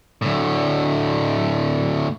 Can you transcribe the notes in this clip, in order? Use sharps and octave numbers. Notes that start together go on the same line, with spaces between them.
D2 A2